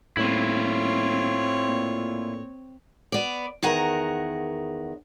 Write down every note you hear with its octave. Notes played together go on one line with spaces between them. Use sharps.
D#1 A2 C4 E4 F4 C#5
A#2
B3 D5
E2 D#3 G#4 A#4 F#5 A#5